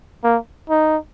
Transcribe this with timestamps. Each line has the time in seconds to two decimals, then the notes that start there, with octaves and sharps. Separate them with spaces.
0.23 A#3
0.70 D#4